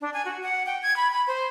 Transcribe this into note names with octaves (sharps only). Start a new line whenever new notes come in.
D4
G#5
F#4
F#5
G5
G#6
B5
B5
C5